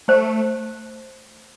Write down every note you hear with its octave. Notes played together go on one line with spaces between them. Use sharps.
A3 C5